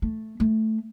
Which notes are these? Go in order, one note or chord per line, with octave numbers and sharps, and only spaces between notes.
A3
A3